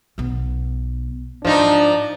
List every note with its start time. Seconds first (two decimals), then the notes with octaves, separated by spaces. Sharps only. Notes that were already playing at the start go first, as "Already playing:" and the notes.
0.18 B1 B3
1.45 G#2 F3 D4 D#4